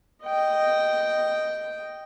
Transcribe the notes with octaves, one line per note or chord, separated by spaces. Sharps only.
D#5 G5